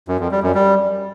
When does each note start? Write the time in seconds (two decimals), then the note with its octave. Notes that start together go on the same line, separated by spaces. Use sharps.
0.08 F#2
0.20 F2
0.31 G3
0.43 F#2
0.55 G3